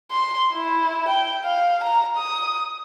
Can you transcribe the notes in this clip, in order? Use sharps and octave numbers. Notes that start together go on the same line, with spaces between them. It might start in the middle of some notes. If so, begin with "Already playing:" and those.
C6
E4
G5
F5
A#5
D#6